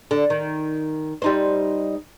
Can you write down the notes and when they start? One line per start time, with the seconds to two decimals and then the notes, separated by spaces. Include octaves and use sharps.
0.11 D3
0.30 D#3
1.22 G3 D#4 C5